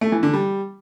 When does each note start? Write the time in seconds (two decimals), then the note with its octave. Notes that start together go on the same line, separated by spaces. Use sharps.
0.01 A3
0.12 E3
0.23 D3
0.33 G3